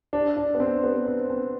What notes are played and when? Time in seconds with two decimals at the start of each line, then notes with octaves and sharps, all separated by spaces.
0.13 D4
0.37 D4
0.54 B3
0.60 C4
0.84 B3
1.06 C4
1.30 C4